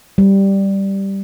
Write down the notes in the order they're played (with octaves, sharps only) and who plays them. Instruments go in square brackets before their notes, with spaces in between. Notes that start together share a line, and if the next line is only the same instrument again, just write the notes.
[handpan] G3